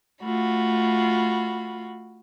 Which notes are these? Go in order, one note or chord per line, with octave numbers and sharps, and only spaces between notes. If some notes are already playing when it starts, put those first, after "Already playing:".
A3 F4 F#4 B5